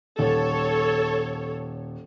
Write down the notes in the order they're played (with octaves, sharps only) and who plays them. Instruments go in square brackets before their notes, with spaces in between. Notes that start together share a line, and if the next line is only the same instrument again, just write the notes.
[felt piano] D#1 [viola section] A4 C#5